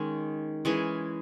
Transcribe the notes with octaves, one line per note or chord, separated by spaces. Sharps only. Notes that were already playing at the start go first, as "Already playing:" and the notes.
Already playing: D#3 G#3 C#4
E3 G#3 C#4 G#4